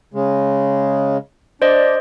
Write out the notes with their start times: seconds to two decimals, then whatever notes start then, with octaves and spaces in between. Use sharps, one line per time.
0.14 C#3 G#3
1.62 D4 C5 D5 D#5